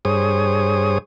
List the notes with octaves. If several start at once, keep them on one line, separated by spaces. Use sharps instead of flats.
G2 G#4 C5 C#5 D#6